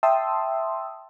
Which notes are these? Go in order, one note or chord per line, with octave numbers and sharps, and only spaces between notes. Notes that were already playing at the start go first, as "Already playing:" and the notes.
E5 G5 A5 C6 D#6 E6